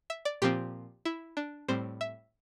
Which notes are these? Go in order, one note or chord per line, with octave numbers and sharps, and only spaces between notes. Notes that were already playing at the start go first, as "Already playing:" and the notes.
E5
D5
A#2 F3 C4 G4
E4
D4
A2 G3 C4 C5
E5